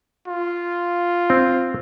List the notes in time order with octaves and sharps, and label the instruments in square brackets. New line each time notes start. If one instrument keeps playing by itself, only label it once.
[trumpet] F4
[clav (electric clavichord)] C4